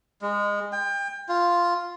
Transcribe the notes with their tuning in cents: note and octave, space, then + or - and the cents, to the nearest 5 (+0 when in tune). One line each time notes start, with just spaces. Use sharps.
G#3 -20
G5 +30
F4 +0